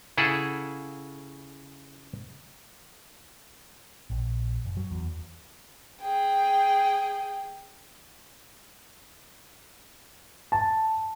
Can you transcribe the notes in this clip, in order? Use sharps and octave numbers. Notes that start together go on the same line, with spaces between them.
C#3 E4 G#4 A4 F#5
A#1
F#1
F#3
E2
G#4 G5
A5